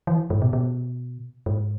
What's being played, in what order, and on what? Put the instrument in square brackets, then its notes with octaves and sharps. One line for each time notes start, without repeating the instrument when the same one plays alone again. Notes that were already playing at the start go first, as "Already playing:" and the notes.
[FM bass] E3
G#2
B2
B2
G#2